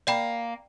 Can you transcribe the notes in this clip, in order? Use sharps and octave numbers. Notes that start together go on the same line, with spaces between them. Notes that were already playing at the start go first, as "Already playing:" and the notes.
A#3 D5 G5 B5